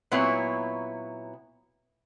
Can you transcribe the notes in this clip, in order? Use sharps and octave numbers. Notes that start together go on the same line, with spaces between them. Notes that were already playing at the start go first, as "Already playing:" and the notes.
A#2 F#3 B3 C4 E4 C#5